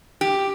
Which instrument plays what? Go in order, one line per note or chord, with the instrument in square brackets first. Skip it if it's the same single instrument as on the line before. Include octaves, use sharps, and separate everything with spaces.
[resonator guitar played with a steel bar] G4